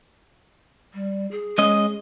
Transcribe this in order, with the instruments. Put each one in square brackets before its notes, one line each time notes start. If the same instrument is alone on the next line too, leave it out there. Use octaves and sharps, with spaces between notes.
[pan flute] G3
G#4
[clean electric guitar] G#3 C#4 D#5